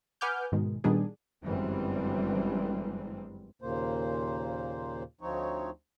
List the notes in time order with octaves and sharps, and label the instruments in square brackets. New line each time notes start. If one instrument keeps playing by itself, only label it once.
[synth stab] B4 F#5 G#5 D6 F6 G6
G#2 B2 D#3 G#3
A#2 D#3 G3 B3 D4 G#4
[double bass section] G1 F#2 E3 G3 G#3 C4
[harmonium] D#2 A#2 C#3 A#3 C5
D2 F3 C4 D#4 C#5